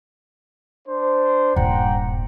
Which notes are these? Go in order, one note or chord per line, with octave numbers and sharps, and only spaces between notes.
D4 C5
D#1 G2 F#5 G5 A#5